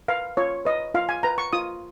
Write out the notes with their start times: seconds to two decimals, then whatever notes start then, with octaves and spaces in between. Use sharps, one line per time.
0.08 B4 F5
0.37 F4 C#5
0.65 B4 D#5
0.94 F4 F5
1.09 G#5
1.23 B4 A#5
1.38 C#6
1.53 F4 D#6